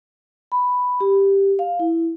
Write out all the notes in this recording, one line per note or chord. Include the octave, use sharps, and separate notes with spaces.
B5
G4
F5
E4